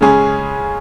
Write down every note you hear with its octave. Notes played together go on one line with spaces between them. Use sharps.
C#3 G#3 C#4 G#4